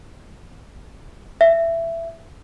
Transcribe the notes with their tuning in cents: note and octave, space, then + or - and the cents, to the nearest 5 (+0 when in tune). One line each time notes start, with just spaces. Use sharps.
E5 +15